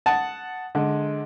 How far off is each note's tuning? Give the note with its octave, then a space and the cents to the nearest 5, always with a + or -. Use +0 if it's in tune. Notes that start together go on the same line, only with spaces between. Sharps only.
F#5 +0 A5 +0 D#6 +0
D3 +0 G#3 +15